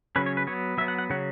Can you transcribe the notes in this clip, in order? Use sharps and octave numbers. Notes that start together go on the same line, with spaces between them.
C#3 F#3 C#4 B4
C#5
B4
F#3 B3 C#5
F#3 B3 E5
F#5
F#5
C#3 F#3 C#4 F#5